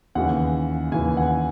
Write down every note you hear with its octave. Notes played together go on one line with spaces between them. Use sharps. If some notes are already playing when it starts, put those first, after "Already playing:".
D#2 C#3 E3 F#5
D#2 C#3 E3 G#5
F#5